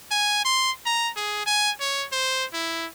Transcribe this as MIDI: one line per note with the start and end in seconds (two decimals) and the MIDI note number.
0.11 0.42 80
0.45 0.71 84
0.86 1.10 82
1.17 1.43 68
1.46 1.71 80
1.80 2.06 73
2.12 2.45 72
2.53 2.86 64